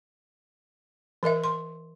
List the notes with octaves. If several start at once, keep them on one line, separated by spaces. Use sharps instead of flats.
E3 A#4 D#5 E5
C6